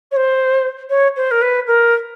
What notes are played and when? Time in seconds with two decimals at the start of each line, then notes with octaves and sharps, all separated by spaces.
0.11 C#5
0.16 C5
0.89 C#5
1.16 C5
1.31 A#4
1.41 B4
1.67 A#4